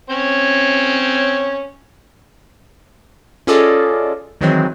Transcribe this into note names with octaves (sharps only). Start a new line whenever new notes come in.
C4 C#4 C#5
C#4 F4 G#4 A4 D5 D#5
D#3 E3 F#3 G#3 C4